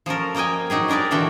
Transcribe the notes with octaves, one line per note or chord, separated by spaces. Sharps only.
F3 C#4 A4 A#4
A#3 A#4 D#5 G5 G#5
F#3 D#4 G4 G#4
G#3 D4 A#4 B4 D5
A#2 D3 E3 D4 F#4 G5